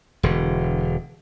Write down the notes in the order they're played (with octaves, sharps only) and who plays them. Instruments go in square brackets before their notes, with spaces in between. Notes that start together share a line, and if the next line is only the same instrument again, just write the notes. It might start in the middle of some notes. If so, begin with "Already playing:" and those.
[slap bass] E1 D3